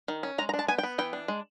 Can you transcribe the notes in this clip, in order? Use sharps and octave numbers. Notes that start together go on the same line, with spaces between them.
D#3
C#4
G#3 A#5
A#5
D4
A5
B3 G#5
G5
B3
E3 G5
D4
G#3